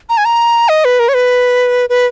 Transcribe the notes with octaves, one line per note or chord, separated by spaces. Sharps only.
A#5
G#5
A#5
D#5
B4
A#4
C#5
B4
B4